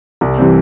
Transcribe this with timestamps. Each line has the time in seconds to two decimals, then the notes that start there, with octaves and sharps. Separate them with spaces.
0.21 C2
0.38 C3 E3 G3 C4